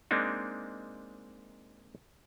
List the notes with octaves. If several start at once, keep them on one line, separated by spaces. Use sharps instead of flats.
G#3 A#3 C4 D4 D#4